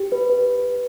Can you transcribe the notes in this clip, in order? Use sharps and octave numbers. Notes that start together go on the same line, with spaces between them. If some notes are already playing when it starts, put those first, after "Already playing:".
Already playing: G4
B4
B4